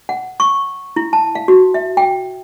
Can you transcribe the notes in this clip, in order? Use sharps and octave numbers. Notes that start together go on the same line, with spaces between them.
F#5
C#6
E4
A5
F5
F#4
E5
G5